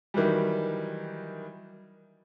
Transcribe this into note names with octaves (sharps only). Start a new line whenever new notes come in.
D#3 E3 F#3 G3